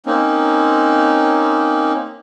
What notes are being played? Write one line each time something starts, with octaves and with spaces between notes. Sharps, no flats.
A#3 C4 C#4 D#4